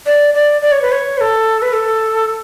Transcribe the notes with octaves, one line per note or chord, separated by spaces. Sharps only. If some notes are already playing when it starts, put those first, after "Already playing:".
D5
D5
D5
C#5
B4
C#5
B4
A4
B4
A4